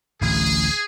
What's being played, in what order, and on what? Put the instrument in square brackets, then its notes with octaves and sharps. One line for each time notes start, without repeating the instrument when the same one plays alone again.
[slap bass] D1 A1 D2 [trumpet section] G#4